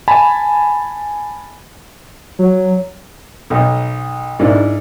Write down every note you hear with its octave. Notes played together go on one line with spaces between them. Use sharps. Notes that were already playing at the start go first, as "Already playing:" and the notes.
G#5 A5 B5
F#3
B1
G#2 A#3 D4 E4